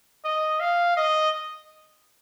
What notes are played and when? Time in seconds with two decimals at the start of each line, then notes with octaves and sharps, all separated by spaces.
0.25 D#5
0.60 F5
0.97 D#5